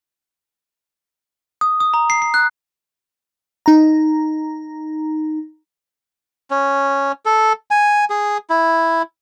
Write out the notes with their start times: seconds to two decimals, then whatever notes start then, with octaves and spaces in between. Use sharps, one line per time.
1.61 D#6
1.80 D#6
1.94 A#5
2.10 C7
2.22 C7
2.34 F#6
3.66 D#4 A#5
6.51 C#4
7.26 A4
7.71 G#5
8.10 G#4
8.50 E4